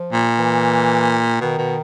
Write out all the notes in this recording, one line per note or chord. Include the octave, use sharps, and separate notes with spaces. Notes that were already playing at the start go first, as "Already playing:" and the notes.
Already playing: F3
A#2
E3
B2 D#3
B2